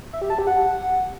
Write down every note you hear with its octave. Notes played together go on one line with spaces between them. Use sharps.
E5
G4
A5
G4
F#5